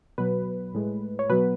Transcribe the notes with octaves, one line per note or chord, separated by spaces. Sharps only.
B2 F#3 B4
A2 G#3
C#5
B2 F#3 B4